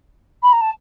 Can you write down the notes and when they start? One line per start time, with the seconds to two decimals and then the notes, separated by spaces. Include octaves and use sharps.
0.43 B5
0.52 A#5
0.61 A5